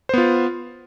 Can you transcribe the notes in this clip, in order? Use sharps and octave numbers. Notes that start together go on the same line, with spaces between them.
B3 F4 C5